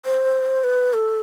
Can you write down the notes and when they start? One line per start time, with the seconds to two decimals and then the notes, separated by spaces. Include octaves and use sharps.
0.05 C5
0.64 B4
0.94 A4